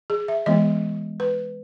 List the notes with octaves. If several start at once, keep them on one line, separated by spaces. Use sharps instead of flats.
G#4
E5
E3 G#3 B3 D#5
B4